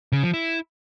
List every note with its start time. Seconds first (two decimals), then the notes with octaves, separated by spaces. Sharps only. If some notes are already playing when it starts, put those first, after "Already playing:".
0.12 C#3
0.23 F3
0.34 E4